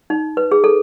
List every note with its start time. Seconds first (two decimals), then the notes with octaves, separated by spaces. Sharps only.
0.10 D#4
0.37 B4
0.52 G#4
0.64 A4